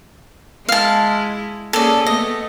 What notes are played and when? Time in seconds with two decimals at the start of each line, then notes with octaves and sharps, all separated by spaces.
0.69 G#3 E4 F5 A5
1.73 A#3 C#4 G#4 A4 D5
2.06 A3 B3 D#5